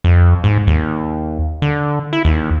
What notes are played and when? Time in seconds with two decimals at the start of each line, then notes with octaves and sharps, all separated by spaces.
0.04 F2
0.44 G#2
0.67 D#2
1.62 D3
2.13 E4
2.25 D#2